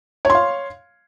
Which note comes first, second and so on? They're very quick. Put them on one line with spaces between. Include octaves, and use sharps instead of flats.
C#5 C6 F5